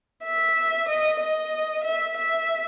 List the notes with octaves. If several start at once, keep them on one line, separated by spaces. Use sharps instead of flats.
E5
D#5
D#5
E5
E5